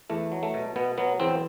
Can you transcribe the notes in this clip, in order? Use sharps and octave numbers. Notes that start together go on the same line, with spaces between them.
E2 A3
F#3
A3
B2
B2 B3
F#3 B3
E2 C4